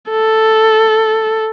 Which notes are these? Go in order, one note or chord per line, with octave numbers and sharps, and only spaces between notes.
A4